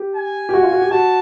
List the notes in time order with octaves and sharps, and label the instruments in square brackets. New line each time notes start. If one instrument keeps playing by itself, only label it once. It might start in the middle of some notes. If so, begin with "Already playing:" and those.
Already playing: [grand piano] G4
[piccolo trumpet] G#5
[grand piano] G4
F#4
F4
F#4
G4
[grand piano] F#4 [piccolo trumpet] A5